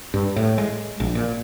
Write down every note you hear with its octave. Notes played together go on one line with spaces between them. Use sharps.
G2
A2
G#3
A#1
A#2